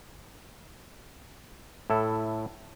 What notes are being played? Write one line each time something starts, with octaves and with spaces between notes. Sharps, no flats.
A2 E4 A4